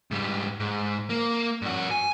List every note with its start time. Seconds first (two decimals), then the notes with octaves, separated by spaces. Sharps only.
0.11 G#2 G3
0.60 G#2
1.10 A#3
1.62 G2 F#4
1.91 G#5